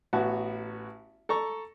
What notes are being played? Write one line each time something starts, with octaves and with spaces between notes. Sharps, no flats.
A1 B3 F#4 A5
A4 A#5 C#6